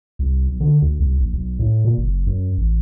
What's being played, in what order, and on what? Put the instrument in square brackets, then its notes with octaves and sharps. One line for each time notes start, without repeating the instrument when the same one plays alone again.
[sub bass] C2
B1
D3
D2
C2
A#1
B1
A2
A#2
F#1
F#2
A1